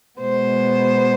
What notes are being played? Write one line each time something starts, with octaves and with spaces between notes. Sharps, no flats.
B2 G#3 B3 C5